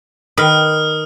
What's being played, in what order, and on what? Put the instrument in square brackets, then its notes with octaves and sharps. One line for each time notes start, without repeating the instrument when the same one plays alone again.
[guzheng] D#3 B4 [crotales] D#6 F6